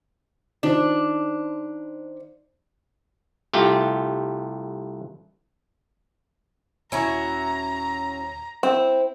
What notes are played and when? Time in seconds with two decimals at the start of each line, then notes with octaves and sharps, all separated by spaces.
0.63 D#3 D4 F4 C5
3.53 C2 A3 F4 G4
6.92 D#1 C#4 E4 F#4 A#5
8.63 C4 E4